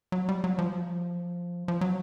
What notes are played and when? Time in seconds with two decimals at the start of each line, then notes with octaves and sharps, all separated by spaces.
0.12 F#3
0.29 G3
0.44 F#3
0.59 F3
1.68 F3
1.81 F#3